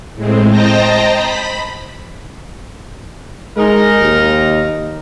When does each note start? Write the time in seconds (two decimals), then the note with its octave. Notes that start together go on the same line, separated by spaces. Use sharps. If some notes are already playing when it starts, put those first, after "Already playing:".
0.15 A2 G#3 C4
0.50 C5 D#5 G5 A5 A#5 A#6
1.14 B5 B6
3.57 G#3 D#4 A#4
4.00 D#2